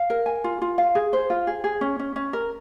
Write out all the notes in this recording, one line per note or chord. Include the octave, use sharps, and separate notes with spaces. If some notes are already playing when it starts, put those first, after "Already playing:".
Already playing: F5
A#4
G#5
F4
F4
F5
G#4
C5
F4
G#4
G#4
C#4
C#4
C#4
A#4